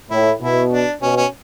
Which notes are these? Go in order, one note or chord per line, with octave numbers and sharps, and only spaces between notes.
A2 E4
B2 E4
D4
B2 C#4
C#4